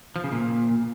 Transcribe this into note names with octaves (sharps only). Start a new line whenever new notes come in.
F3
C#3
A#2